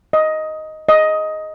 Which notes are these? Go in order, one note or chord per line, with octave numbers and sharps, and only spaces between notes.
D#5
D#5